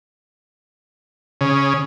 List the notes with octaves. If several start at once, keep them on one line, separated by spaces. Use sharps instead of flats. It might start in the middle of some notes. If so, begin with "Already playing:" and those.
C#3